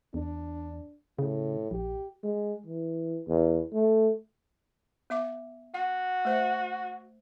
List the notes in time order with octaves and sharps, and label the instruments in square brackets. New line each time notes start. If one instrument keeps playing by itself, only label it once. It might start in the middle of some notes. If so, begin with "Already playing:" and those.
[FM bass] E2 [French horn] D4
[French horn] A2 [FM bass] C#3
[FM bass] A#1 [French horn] G4
[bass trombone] G#3
E3
E2
A3
[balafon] B3 E5 D6
[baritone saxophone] F#4 [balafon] F#5
[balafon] A3 C5 E5